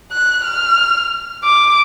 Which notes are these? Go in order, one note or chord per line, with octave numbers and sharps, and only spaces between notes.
F#6
F6
D6